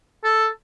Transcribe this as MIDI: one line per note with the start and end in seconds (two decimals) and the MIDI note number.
0.24 0.47 69